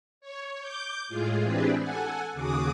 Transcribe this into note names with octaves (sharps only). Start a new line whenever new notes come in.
C#5
D6 G6
A2 G#3 F4 G#4
E3 C4 D4 G4 G#4 B4
A4 F#5 G#5
D#2 C#3 F#4 G#4 D6 D#6